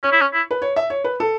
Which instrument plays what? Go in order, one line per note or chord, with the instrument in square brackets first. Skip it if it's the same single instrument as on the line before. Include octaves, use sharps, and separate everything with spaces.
[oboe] C#4 [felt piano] C#5
[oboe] E4
C#4
E4
[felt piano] B4
C#5
E5
C#5
B4
A4